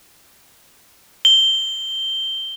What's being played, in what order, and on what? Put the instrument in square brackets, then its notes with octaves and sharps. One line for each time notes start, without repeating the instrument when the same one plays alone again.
[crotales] G7